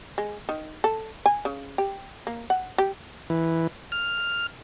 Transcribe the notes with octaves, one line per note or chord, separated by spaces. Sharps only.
G#3
D#3
A4
G#5
C#3
G4
A#3
F#5
G4
E3
F6